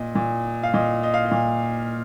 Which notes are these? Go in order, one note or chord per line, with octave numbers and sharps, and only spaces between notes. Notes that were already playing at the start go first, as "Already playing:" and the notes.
Already playing: A#2 D#5
A#2
F5
A#2 D#5
D#5
F5
D#5
A#2